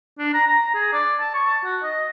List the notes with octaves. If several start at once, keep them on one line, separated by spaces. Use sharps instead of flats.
D4
A#5
A#5
G#4
D5
A5
C#6
A5
F#4
D#5